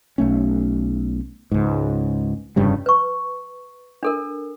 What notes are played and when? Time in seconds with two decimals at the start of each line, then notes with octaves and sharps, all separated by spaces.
0.18 B1 A3 C#4
1.51 C#2 G#2
2.56 F1 G2 C#3 G3
2.86 B4 C#6
4.03 D4 A4 A#4